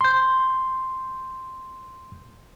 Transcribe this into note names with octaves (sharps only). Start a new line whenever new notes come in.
C6 G6